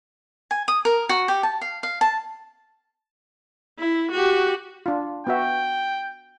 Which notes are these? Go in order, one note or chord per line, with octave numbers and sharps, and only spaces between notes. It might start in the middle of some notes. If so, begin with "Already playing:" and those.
G#5
D#6
A#4
F#4
G4
A5
F5
F5
A5
E4
F#4 G4
D4 F4
B3 F#4 E5 G5